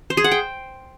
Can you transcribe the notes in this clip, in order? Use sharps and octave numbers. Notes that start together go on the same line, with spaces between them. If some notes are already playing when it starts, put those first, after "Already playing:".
C5
G#4
F#5
G5